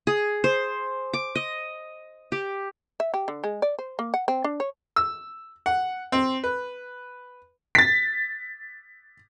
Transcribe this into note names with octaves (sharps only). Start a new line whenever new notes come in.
G#4
C5
D6
D#5
G4
E5
G4
D3
G#3
D5
C5
A#3
F#5
C4
D4
C#5
E6
F#5
C4
B4
A6 B6